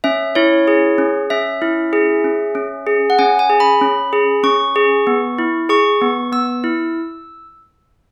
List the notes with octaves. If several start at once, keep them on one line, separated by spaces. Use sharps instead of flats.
C#4 E5
E4 C#5
G#4
C#4
C#4 E5
E4
G#4
C#4
C#4
G#4
F#5
C#4 G#5
G#5
G#4
B5
C#4
G#4
C#4 C#6
G#4
B3
E4
G#4 C#6
B3
B3 E6
E4